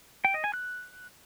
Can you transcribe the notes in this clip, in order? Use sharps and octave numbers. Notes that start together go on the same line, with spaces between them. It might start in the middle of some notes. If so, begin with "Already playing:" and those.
G5
D#5
G#5
F#6